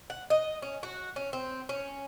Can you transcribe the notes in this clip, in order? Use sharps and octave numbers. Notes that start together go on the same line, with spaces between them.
F#5
D#5
C#4
F#4
C#4
C4
C#4